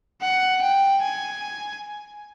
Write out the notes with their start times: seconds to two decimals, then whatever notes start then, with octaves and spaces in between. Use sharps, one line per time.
0.21 F#5
0.62 G5
1.02 G#5